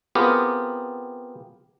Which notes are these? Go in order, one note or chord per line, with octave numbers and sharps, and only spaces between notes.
B3 C4 F4 G4 G#4 A#4